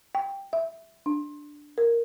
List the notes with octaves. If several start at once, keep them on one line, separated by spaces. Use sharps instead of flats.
G5
E5
D4
A#4